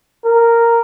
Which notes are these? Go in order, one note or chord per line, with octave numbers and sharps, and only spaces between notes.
A#4